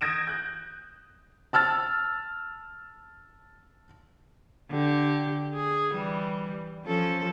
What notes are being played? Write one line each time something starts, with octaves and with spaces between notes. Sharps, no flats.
D#6 G6 G#6 A#6 D7 E7
F#6 G6
A5 E6 F6 A6
D3 G4
G#4
E3 G3
F3 C#4 A4